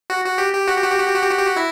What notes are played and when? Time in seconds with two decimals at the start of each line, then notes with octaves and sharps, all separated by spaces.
0.10 F#4
0.24 F#4
0.38 G4
0.53 G4
0.68 F#4
0.76 G4
0.84 F#4
0.92 G4
0.99 F#4
1.08 G4
1.16 F#4
1.23 G4
1.31 F#4
1.38 G4
1.46 F#4
1.56 E4